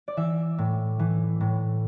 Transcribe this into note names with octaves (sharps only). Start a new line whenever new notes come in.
D5
E3 E5
A2
E3
A2